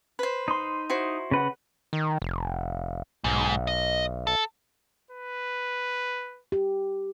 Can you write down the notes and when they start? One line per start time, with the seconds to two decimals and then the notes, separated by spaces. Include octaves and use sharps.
0.19 B4 C5
0.48 D#4 C6
0.90 E4 F#4 C5
1.31 C#3 B4 F#5
1.93 D#3
2.22 F1
3.24 B1 G#2
3.67 D#5
4.27 A4
5.11 B4
6.52 G4